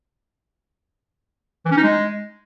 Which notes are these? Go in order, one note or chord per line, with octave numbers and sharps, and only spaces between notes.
E3
C#4
D#4
G#3